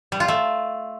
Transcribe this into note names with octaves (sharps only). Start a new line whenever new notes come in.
G3
F4
A3